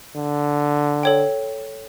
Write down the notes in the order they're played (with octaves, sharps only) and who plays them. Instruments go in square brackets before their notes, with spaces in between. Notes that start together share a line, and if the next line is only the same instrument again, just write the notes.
[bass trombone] D3
[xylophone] A4 C#5 G5